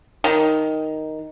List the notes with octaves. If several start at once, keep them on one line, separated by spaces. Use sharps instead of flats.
D#3